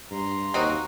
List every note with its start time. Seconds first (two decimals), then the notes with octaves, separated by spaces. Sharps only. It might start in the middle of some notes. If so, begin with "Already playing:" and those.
0.11 G2 A#5 C6
0.54 D#2 C4 D#4 F#4